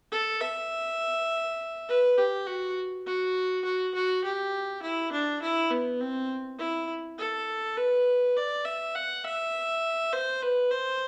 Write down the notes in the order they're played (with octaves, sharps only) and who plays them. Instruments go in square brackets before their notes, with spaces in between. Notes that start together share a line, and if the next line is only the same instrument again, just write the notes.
[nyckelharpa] A4
E5
B4
G4
F#4
F#4
F#4
F#4
G4
E4
D4
E4
B3
C4
E4
A4
B4
D5
E5
F#5
E5
C5
B4
C5